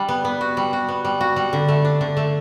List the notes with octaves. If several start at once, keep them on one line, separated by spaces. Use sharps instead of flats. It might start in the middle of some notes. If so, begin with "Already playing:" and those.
Already playing: G3 D4
B3
B3
F#4
G3
F#4
B3
G3
F#4
G3
D3
A3
D4
D3
A3